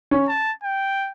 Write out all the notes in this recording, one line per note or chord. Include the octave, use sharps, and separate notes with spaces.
C#4
A5
G5